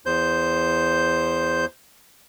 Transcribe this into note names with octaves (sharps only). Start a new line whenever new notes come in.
E2 C5 G6